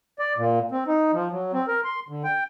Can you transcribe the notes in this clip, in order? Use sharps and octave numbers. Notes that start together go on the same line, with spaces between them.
D5
A#2
C4
D#4
F3
F#3
C4
A#4
C6
D3
G5